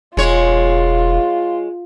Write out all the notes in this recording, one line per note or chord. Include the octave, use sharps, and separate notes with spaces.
E1 G#3 F4 C#5